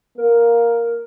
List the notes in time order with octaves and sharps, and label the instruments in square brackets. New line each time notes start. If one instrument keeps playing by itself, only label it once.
[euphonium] A#3 [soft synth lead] A#4